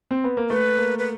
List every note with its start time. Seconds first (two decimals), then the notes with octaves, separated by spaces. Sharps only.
0.11 C4
0.24 B3
0.37 A#3
0.50 A3 B4
0.78 A#3
0.98 B4